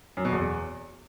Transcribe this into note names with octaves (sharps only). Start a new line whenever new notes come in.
F#2
B2
E2